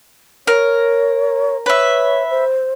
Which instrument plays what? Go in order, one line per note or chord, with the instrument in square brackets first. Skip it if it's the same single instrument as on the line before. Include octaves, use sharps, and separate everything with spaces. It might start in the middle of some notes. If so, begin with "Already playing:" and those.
[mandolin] A#4 [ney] C#5
[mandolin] B4 E5 [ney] C#5
[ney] C5